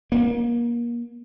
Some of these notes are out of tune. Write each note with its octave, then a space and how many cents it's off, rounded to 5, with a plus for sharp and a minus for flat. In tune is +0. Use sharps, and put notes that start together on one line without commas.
A#3 +30